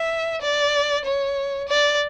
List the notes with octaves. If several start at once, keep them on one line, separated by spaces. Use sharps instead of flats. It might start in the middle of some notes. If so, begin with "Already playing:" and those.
Already playing: E5
D5
C#5
D5